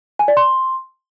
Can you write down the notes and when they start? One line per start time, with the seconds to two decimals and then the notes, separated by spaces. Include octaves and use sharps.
0.19 G#5
0.28 D5
0.37 C6